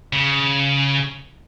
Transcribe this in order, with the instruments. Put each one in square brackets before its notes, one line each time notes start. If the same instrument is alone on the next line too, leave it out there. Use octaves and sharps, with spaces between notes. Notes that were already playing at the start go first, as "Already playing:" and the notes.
[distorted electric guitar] C#3